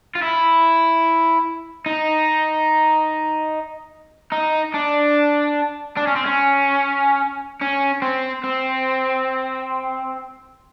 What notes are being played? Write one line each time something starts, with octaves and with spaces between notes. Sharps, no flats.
F4
E4
D#4
D#4
D4
D4
C#4
C4
C#4
C#4
C4
C4